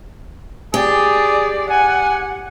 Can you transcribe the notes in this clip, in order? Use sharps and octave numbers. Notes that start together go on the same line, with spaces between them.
G4 G#4 D5
F#5 G#5